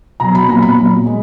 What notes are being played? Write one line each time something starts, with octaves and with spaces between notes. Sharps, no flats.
B2 F#3 A#5
B5
A#2 F#3 A#5
B5
A#2 F#3
G#3